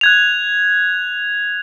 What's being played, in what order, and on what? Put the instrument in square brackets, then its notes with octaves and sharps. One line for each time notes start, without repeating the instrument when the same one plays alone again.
[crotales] F#6 G#6 F7